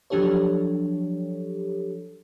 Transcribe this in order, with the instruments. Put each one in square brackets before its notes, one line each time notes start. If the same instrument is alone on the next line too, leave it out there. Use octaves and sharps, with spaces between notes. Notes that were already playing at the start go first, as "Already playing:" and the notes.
[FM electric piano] F3 F#3 D4 G4 A4 C#5